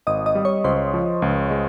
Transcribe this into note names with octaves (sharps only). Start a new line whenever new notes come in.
G#1 D#5 D#6
D#5 D#6
G3
C#5 C#6
C#2 C5 C6
F3
C#2
G#3